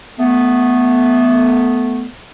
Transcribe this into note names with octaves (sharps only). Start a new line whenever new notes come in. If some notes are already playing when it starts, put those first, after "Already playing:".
A3 B3